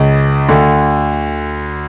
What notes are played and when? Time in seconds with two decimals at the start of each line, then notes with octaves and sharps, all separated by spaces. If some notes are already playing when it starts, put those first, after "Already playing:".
Already playing: C#2 C#3
0.49 D2 D3